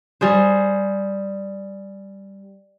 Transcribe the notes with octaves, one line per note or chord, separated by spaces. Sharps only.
G3 G#4 C5